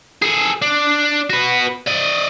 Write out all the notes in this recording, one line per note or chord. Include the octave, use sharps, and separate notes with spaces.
G#4 A4
D4
F#4 B4
D5 D#5